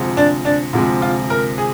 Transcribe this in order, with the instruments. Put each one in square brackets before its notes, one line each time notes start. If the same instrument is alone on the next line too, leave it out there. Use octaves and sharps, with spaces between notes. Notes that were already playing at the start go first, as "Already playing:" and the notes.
Already playing: [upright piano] D2 C3 F3 G#3
[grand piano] D4
D4
[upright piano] D2 C3 F3 G#3
[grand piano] F4
A#4
G#4